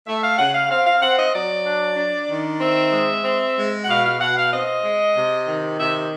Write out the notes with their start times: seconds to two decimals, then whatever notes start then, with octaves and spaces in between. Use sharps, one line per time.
0.06 A3 E5
0.22 F5
0.38 C#3 F#5
0.53 F5
0.70 C4 F5
0.86 F5
1.01 C4 F#5
1.17 D#5
1.33 F#3 D5
1.65 D4
1.97 D4
2.29 D#3
2.60 C4 E5
2.92 G#3
3.24 C4
3.56 G#3
3.84 F#5
3.88 B2 F5
4.03 F5
4.19 B2 F#5
4.36 F5
4.51 C4 D#5
4.84 G#3
5.15 C3
5.47 D#3
5.78 C3 E5